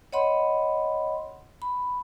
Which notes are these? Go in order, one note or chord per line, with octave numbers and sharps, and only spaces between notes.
C#5 D#5 F#5 B5 C6
B5